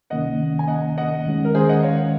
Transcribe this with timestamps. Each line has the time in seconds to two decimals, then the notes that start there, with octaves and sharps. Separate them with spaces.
0.10 C#2 C3 D#3 A#3 C#4 D#5 F#5
0.59 G#5
0.67 D#5 F#5
0.98 D#5 F#5
1.25 D#2 D#3 G#3 C#4
1.45 A#4
1.55 G#4 C5
1.69 D#5 F#5
1.83 C#5 F5